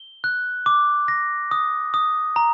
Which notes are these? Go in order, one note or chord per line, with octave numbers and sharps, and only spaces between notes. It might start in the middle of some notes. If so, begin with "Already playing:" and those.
Already playing: G7
F#6
D6
A#6
D#6
D#6
A#5